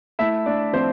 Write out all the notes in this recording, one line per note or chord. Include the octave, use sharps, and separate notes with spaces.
A3 E4 E5
A3 D4 D5
F3 C4 C5